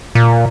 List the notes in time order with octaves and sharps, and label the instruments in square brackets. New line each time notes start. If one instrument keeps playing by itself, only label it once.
[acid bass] A#2